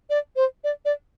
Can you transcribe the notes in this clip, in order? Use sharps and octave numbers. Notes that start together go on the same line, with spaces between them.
D5
C5
D5
D5